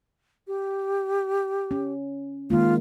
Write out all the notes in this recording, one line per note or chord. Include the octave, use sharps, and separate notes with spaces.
G4
C#4
D#3 G#3 A#3 F4